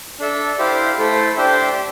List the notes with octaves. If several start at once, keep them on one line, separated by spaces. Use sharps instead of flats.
D4 A4 E5
E4 G4 C5 F5
A3 E4 A4 C5
D4 G4 C5 E5 G5